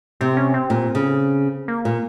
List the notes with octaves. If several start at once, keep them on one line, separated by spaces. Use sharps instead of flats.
C3 C4
C#4
C4
A#2
C#3
A#3
A#2